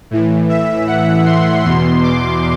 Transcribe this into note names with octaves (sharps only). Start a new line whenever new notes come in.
A2 E3
E5
F#5
C6
E2 B2 C6
D6